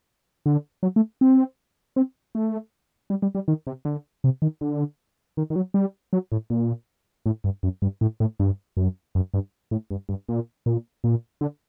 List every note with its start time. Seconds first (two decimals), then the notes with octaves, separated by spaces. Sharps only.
0.46 D3
0.83 F#3
0.96 A3
1.21 C4
1.96 C4
2.35 A3
3.10 G3
3.22 G3
3.35 G3
3.48 D#3
3.67 C3
3.85 D3
4.24 C3
4.42 D#3
4.61 D3
5.37 D#3
5.50 D#3
5.56 F#3
5.74 G3
6.13 F#3
6.32 A2
6.50 A#2
7.26 A2
7.44 G2
7.63 F#2
7.82 G2
8.01 A2
8.20 A2
8.40 G2
8.77 F#2
9.15 F#2
9.34 G2
9.71 A2
9.91 G2
10.09 G2
10.29 A#2
10.66 A#2
11.04 A#2
11.41 D3